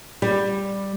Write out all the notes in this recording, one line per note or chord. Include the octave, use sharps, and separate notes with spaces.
G3